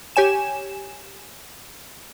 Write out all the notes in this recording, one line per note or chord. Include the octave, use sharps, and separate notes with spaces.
G4 C#5 G#5 E7